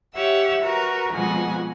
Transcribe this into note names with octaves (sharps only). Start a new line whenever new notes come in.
G4 C#5 E5 F#5 E6
F#4 A#4 B4
F2 B2 G#3 F#5 G#5